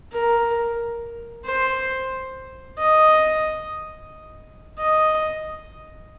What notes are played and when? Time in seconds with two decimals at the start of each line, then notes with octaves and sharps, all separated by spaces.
0.13 A#4
1.45 C5
2.79 D#5
4.78 D#5